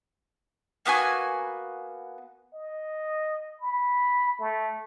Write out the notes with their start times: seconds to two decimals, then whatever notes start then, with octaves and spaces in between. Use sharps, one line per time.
0.86 A#3 B3 F#4 G#5
2.54 D#5
3.60 B5
4.39 A3